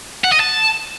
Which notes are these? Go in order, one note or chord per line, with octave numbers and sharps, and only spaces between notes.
F#5
D#5
A5